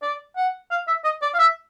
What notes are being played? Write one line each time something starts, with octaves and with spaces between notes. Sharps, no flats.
D5
F#5
F5
E5
D#5
D5
F5
E5